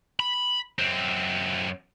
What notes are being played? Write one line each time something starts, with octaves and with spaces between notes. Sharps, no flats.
B5
F#2 C4